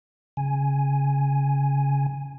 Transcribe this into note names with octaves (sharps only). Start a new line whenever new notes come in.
C#3 G#5